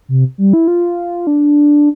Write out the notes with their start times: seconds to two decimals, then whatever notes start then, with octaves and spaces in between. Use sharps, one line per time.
0.09 C3
0.38 G3
0.53 E4
0.68 F4
1.27 D4